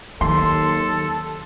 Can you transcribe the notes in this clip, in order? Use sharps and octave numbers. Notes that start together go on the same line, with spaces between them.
D#2 D#3 F#3 A4 C6